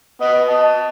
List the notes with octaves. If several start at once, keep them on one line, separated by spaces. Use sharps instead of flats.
B3 D#5
D#5 A5